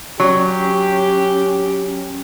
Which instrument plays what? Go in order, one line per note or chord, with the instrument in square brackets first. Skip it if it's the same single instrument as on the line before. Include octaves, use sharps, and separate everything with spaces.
[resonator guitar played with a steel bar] F#3 [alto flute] C#4 [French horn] G4